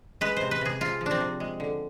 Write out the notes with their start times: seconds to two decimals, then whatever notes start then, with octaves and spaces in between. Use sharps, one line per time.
0.21 G#3 B4
0.37 C3 C5
0.51 B4
0.61 C3 G#4
0.81 C3 F4
1.01 F3
1.06 C4 D4
1.20 C3
1.40 G#3
1.60 D3